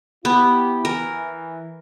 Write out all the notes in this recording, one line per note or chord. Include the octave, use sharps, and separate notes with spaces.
B3 E4 G4
E3 A#4